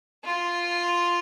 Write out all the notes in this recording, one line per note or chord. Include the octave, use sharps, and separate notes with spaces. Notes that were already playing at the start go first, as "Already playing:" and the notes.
F4